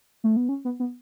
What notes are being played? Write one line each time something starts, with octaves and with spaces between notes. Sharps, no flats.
A3
B3
C#4
B3
B3